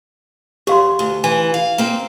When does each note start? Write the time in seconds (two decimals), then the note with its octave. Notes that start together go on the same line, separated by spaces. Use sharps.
0.67 E2 G4 F5 C6
0.99 D2
1.24 E3 G#5
1.54 F5
1.78 A#3 C4